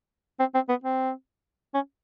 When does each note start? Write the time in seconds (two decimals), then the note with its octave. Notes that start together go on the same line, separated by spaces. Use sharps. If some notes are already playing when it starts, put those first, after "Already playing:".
0.39 C4
0.55 C4
0.69 B3
0.84 C4
1.74 C#4